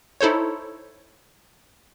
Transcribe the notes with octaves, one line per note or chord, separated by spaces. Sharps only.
D#4 E4 A4 C5 C#5